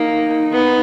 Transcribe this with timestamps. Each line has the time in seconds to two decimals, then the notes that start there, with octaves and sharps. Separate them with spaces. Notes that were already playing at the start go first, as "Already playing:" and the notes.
Already playing: A#3 D#4
0.53 B3